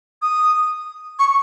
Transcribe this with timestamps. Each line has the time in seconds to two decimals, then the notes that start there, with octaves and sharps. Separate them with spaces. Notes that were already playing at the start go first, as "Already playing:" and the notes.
0.22 D#6
1.19 C#6